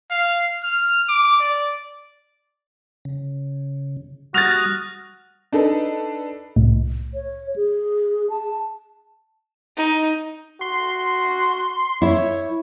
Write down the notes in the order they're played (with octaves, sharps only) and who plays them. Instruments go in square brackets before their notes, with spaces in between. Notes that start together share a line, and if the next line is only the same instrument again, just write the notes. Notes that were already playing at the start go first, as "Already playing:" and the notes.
[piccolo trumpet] F5
F6
D6
D5
[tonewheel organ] C#3
[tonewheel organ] G3 D#6 F6 [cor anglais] F#4 [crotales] F#6 A#6 [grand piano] A6 F7
[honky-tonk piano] D4 D#4 A4 B4
[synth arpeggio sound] C2 A2
[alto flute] C#5
G#4
A5
[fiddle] D#4
[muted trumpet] F#4 [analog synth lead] C6
[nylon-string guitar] E4 E5 [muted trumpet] C#5